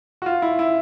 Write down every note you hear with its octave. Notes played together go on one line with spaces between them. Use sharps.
F#4
F4
E4
E4